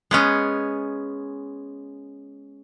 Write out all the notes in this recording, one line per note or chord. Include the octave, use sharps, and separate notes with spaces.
G#3 B3 C#4